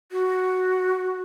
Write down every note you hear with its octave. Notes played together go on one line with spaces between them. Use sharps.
F#4